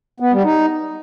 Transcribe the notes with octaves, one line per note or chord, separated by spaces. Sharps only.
B3
G3
D#4